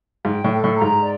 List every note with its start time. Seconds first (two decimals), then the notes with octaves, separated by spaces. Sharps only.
0.25 G#2 G5
0.44 A2
0.51 A4
0.64 A2
0.76 A#5
0.82 G#2
1.01 D5